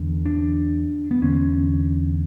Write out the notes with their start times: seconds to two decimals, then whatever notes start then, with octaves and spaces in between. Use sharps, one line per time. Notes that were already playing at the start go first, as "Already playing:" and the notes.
Already playing: E2 D3
0.26 D4
1.11 B3
1.22 E2 D3 C#4